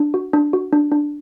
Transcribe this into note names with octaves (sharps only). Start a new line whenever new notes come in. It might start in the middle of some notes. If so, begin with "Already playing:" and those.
Already playing: D4
F#4
D4
F#4
D4
D4